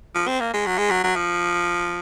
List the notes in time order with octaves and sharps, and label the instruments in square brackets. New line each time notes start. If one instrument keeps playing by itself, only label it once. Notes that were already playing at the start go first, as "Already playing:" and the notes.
[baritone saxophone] F3
C4
A#3
G#3
F#3
G#3
F#3
F#3
F3